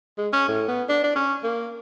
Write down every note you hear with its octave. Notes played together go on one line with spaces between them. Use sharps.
G#3
C#4
A2
B3
D4
D4
C#4
A#3